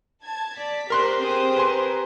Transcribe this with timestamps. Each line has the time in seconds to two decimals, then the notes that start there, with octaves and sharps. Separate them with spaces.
0.24 A5 G#6
0.58 D5 B6
0.90 G4 A#4 C5 C6 F#6
1.21 C4 G#4 D#6
1.56 A#4 B4 G#5 C6